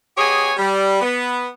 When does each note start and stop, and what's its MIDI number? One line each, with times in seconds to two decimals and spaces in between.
0.17 0.52 59
0.17 0.52 67
0.17 0.52 68
0.17 0.52 73
0.17 0.52 75
0.17 0.52 80
0.57 0.99 55
1.01 1.47 59